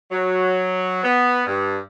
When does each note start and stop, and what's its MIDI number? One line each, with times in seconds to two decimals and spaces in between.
0.11 1.02 54
1.04 1.42 59
1.46 1.77 43